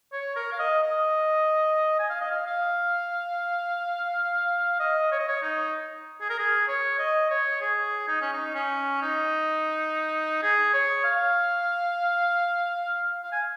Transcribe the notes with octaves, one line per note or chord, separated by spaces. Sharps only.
C#5
A#4
F5
D#5
D#5
G#5
F5
D#5
F5
F5
D#5
C#5
D#5
C#5
D#4
G#4
A#4
G#4
C#5
D#5
C#5
G#4
D#4
C#4
D#4
C#4
D#4
G#4
C#5
F5
F5
G#5